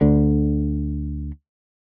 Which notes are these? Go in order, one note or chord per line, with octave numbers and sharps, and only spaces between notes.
D2 D3